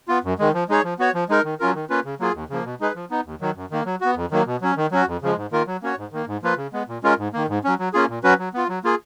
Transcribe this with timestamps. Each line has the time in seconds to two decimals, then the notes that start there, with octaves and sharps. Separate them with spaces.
0.08 B3 F4
0.24 F#2
0.39 D#3 G#3
0.54 F3
0.69 G#3 D#4 G#4 C#5
0.84 F3
0.99 B3 F#4 C#5
1.14 F3
1.29 G#3 D#4 A#4
1.44 D#3
1.60 F#3 C#4 F4 A#4
1.75 D#3
1.90 A#3 C#4 F4 B4
2.05 C#3
2.20 F#3 A#3 F4 G#4
2.34 D#2
2.50 C#3 F3 A#3
2.65 B2
2.80 G#3 D#4 G#4 B4
2.95 F3
3.11 B3 D#4
3.25 D#2
3.41 D#3 F#3
3.56 F#2
3.71 D#3 A#3
3.86 F#3
4.01 B3 F#4
4.16 F2
4.31 D#3 F#3 A#3
4.46 B2
4.61 F#3 C#4
4.77 D#3
4.92 F#3 C#4 F#4
5.07 F2
5.22 C#3 F3 G#3
5.37 G#2
5.52 D#3 A#3 F4 A#4
5.67 F#3
5.82 A#3 C#4 F#4 C#5
5.97 G#2
6.12 D#3 A#3
6.27 G#2
6.43 F3 A#3 F4 B4
6.57 C#3
6.73 G#3 B3
6.88 A#2
7.03 G#3 C#4 F4 A#4
7.18 G#2
7.33 D#3 A#3
7.49 G#2
7.64 F#3 C#4
7.79 F#3
7.94 A#3 C#4 F4 G#4
8.09 A#2
8.24 F#3 C#4 F#4 B4
8.39 F#3
8.54 B3 F4
8.69 F#3
8.84 A#3 F4 G#4